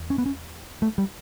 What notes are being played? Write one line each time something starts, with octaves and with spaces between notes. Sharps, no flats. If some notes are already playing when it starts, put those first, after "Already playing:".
Already playing: E2
C#4
B3
C#4
A3
G3